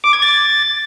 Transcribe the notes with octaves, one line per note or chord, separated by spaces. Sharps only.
D6
G#6
A6